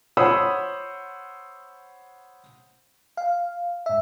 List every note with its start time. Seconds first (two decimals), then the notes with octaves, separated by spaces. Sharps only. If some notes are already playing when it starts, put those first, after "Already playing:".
0.17 C5 C#5 F#5 B5 D#6 E6
3.17 F5
3.86 G#2 E5